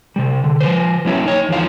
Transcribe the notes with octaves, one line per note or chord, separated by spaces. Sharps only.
C3 G3
D3
F3 B4 C5
F#3 A#3 C#4 E4
D#4 C#5
E2 E3 F3 F5